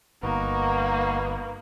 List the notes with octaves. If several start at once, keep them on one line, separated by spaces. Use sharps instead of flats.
G1 A#3 B3 D#4 F#4